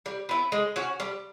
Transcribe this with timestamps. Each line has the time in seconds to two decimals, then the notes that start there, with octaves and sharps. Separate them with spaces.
0.06 G3
0.29 B3 E4
0.52 G#3
0.76 C#4 F#4
1.00 G3